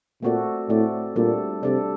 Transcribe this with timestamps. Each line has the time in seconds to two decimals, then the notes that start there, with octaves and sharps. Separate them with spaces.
0.23 A#2 A3 C4 F#4 A4 D5
0.69 A2 A3 C4 F#4 A4 D5
1.16 A#2 G3 D4 A4 D5
1.63 C3 G3 D4 A4 D5